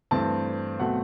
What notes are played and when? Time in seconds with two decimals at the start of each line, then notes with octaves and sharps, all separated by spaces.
0.11 G2 E3 A3 C4 A5
0.80 B2 F#3 A3 C4 F#5